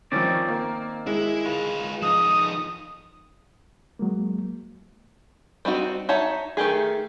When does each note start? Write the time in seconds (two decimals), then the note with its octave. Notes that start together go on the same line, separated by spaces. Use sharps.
0.12 D#3 F3 C4 C#4 D5
0.48 A#3
1.07 G#3 E4
1.46 F4 B4
2.02 F3 D#4 D#6
3.99 F#3 G#3 A#3
5.65 G3 C4 D#4 F#4
6.09 D#4 C#5 E5 F#5 A5
6.57 D#3 A3 G4 G#4